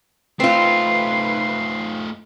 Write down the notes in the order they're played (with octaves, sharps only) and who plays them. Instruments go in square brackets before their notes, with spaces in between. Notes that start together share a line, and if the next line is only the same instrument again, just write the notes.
[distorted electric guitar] A3 D#4 [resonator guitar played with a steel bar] C4 F4 [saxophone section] B4 [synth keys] C7